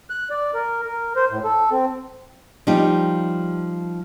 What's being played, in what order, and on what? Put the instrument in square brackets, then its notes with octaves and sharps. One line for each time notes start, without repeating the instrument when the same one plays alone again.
[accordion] F#6
D5
A#4
A#4
C5
A2
A4
C4
[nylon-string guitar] F3 G3 D#4 G4